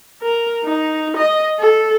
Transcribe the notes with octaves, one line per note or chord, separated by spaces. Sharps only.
A#4
D#4
D#5
A4